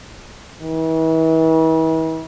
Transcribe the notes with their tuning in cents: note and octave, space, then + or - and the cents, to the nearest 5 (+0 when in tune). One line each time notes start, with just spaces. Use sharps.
E3 -40